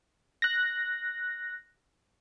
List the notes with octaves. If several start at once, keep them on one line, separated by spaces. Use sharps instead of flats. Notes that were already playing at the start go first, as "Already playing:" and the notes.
F#6 A#6